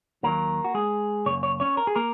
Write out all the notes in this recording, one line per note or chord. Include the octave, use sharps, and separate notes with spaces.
D#2 D#3 F#3 A#3 A#4
F#4
G#3 G#4
F#2 C#3 A#3 C#5
C#5
C#4 C#5
A#4
G#4
A#3 A#4